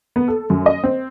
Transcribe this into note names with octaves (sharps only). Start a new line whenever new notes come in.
B3
A4
F#2
D#5
C4